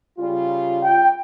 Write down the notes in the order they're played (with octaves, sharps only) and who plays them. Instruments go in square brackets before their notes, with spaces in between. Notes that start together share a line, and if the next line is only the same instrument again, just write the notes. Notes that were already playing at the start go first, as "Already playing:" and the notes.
[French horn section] C#3 G3 F4
[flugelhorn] G5